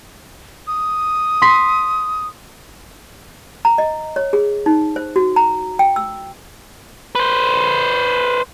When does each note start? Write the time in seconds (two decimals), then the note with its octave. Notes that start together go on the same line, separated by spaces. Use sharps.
0.67 D#6
1.42 C6 B6
3.65 A#5
3.78 D#5
4.16 C#5
4.33 G#4
4.66 D#4
4.96 C5
5.16 F#4
5.36 A#5
5.79 G5
5.96 E6
7.15 B4 C5